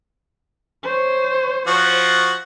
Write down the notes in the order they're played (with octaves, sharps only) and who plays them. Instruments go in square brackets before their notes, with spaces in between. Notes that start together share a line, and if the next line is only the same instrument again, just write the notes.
[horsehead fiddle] C5 C#5
[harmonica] F3 F#4